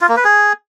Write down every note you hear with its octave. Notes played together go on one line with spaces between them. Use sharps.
F4
A#3
B4
G#4